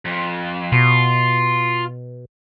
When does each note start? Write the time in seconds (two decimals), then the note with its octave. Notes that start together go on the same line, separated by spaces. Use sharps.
0.05 F2
0.72 B2 F4